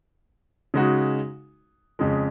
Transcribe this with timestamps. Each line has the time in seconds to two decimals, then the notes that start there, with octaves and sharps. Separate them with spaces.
0.74 C#3 G#3 D#4 F#4
1.99 F2 C#3 G#3